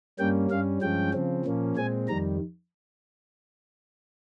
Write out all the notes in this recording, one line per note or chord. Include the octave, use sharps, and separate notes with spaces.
G2 G3 A#3 C#4 G5
G2 G3 C#4 F5
G2 F3 G#3 C#4 G5
C#3 F3 C4
A#2 F3 A#3 C#4
A#2 G#3 C4 G#5
F2 D#3 G3 A#5